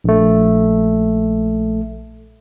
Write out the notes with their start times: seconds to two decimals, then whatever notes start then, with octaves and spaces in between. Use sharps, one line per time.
0.04 A#1 A3